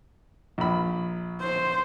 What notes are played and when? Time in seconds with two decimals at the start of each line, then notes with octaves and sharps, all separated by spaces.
0.58 A#1 B5
1.42 C5